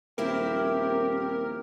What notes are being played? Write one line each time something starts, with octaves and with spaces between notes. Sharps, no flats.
D#1 F3 C4 E4 G4 A#4